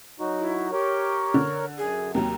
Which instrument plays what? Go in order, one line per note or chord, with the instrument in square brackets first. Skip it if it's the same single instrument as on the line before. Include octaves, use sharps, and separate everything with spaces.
[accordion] F#3 D#4 F#4
[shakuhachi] E4
[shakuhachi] G4 [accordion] A#4 C#5
[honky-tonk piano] D3
[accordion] F#2 [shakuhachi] G#4
[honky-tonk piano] D#2 C3 F#3 [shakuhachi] A#5